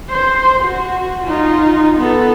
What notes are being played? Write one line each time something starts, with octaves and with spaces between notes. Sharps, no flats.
C5
F#4
D#4 F4
B3 A4